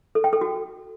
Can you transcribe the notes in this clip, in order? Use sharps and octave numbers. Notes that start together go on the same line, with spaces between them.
A4
G5
A4
F#4